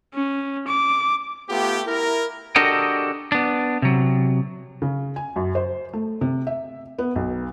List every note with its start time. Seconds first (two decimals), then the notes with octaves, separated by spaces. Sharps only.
0.14 C#4
0.67 D6
1.50 A3 B3 F4 G4
1.86 E4 A#4
2.56 D4 F#4 G4 A4 A#4 D#5
3.32 B3 D4
3.82 C3 F#3
4.82 C#3
5.16 G#5
5.36 F#2
5.55 C5
5.93 A3
6.21 C3
6.47 E5
6.99 B3
7.16 B1